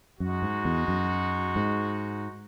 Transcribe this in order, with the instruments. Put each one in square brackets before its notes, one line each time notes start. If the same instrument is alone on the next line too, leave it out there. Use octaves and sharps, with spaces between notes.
[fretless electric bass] F#2 [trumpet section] G#3 D#4 F#4
[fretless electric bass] G#2
E2
F#2
G#2